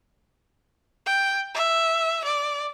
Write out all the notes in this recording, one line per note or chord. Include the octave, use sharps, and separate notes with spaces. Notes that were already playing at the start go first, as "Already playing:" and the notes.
G5
E5
D5